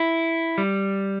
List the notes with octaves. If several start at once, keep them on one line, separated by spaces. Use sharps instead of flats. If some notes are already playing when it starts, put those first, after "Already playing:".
Already playing: E4
G3